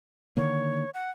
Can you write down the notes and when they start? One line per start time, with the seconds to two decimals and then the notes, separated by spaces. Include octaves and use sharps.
0.37 D3 D#3 A#3 C#5
0.94 F#5